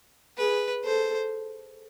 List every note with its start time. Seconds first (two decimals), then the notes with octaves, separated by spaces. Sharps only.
0.37 G#4 B4
0.84 A4 C5